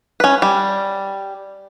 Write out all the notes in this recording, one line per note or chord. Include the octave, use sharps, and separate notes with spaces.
C#4 B4
G3